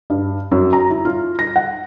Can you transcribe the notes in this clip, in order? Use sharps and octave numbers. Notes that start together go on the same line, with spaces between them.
G2
F#2
A#5
E4
F4
A#6
F#5